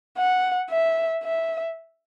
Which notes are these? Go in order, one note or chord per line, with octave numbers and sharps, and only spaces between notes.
F#5
E5
E5